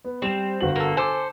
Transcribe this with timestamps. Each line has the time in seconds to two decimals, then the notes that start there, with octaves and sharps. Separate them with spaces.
0.05 B3
0.22 G3 C4 E7
0.61 G1 F#4 F#7
0.76 A#3 A4
0.97 A4 C5 G#5 D6